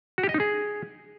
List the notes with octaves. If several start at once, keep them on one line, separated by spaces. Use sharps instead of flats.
F#4
G4
D#5
D#4
G#4